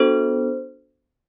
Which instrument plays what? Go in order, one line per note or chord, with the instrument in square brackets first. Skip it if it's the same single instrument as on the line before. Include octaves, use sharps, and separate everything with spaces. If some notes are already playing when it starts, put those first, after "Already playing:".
Already playing: [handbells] B3 D4 F#4 A4 C5